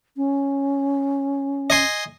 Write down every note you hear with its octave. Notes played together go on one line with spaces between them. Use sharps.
C#4
D#5 G#5 C6